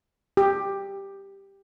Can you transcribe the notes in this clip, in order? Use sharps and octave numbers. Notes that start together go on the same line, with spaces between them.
G4